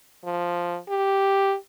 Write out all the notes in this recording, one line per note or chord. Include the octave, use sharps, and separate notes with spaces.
F3
G4